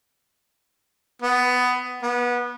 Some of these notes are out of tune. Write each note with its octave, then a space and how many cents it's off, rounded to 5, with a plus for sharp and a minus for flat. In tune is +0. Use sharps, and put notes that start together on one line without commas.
B3 +15
B3 -20